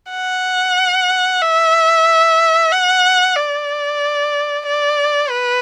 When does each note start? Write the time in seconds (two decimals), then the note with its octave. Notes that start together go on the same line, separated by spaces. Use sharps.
0.11 F#5
1.42 E5
2.72 F#5
3.36 D5
4.66 D5
5.31 B4